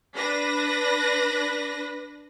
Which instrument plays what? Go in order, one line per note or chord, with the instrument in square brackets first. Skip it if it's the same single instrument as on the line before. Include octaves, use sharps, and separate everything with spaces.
[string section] D4 B4 A#6